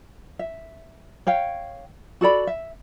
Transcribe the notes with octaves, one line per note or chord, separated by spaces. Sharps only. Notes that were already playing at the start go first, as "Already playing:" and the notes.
E5
C#5 F5 G5
F#4 A4 D5 B5
E5